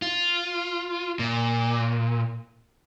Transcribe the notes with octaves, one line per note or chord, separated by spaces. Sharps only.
F4
A#2